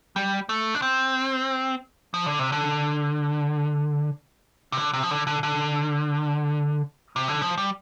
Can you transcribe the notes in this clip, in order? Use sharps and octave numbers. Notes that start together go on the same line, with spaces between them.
G3
A3
D4
C4
F3
D3
C3
D3
C3
D3
C3
F3
D3
D3
D3
C3
D3
F3
G3